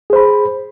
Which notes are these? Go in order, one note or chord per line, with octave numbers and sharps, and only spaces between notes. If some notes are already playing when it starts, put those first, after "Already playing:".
G#4 C5 B5